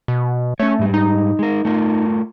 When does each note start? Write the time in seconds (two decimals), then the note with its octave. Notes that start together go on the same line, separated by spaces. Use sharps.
0.08 B2
0.60 A3 C#4 C#5
0.79 G#2 G3
0.94 D#4
1.39 G#3 A#4
1.65 A3 F4 A#4